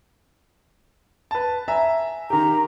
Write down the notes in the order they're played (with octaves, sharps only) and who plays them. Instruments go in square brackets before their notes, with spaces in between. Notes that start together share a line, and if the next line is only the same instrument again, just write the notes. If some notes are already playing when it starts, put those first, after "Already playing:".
[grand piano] B4 A5
E5 G#5 A#5
[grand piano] D#3 G4 [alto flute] A#5